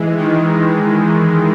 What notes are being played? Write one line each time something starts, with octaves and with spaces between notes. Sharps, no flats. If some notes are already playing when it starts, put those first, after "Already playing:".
Already playing: E3 G#3
D#3